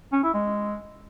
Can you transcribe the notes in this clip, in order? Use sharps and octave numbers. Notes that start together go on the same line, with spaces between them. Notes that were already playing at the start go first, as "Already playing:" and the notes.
C#4
E4
G#3